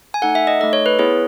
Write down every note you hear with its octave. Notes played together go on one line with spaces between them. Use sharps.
G#5
A3 D#4 A4 F#5
E5
D#5
A3 D#4 A4 D#5
C#5
B4
B3 E4 G#4 C#5